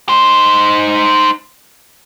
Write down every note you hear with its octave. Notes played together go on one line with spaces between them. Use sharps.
D#4 C5